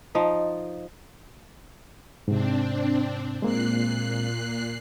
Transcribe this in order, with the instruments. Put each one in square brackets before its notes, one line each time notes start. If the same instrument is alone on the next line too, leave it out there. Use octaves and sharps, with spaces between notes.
[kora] F3 D#4
[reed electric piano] G#2 C3 [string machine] C4 D4
[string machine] A#2 F#6 C7 [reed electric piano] G#3 A#3 C4